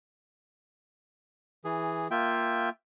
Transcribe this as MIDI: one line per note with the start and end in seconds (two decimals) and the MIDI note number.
1.65 2.08 52
1.65 2.08 68
2.11 2.69 58
2.11 2.69 65
2.11 2.69 76
2.11 2.69 79